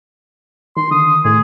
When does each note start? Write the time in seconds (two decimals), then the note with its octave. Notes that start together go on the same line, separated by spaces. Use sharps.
0.77 D#3 C6
0.91 D3 D#6
1.25 A2 G#4